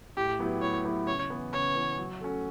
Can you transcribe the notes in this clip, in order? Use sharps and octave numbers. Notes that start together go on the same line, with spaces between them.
A2 G4
F#3 B3 E4 G4
A2 C#5
F#3 B3 E4 G4
C#3 C#5
E3 B3
C#3 C#5
E3 B3
F#3
A3 C#4 F#4 A4